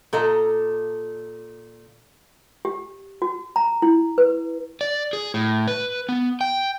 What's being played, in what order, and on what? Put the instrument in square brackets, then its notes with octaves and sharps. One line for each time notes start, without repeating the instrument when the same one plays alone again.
[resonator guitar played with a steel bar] A#2 A4 D#5 A#5
[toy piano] G4
F#4
A#5
E4
B4
[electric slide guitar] D5
G#4
A2
B4
B3
G5